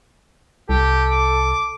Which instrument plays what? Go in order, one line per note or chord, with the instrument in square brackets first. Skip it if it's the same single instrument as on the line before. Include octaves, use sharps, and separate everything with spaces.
[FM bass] C2 [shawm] G4 [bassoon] A4
[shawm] D6